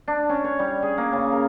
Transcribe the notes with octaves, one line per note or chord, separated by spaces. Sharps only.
D4
C#4
C#5
G3
G#4
A#3
C#3
A#4